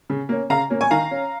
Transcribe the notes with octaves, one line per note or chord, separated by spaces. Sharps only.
C#3
A#3 C#4
C#3 F5 A#5
A#3 C#4
G#5 C#6
D#3 F5 A#5
C#4